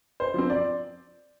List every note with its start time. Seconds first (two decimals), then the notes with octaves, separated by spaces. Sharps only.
0.20 C5
0.34 F3 C4
0.50 D5